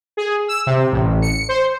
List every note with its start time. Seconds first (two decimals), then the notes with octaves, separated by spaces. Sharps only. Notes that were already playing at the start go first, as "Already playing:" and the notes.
0.17 G#4
0.48 E6
0.67 C3
0.92 A1
1.22 C#7
1.49 C5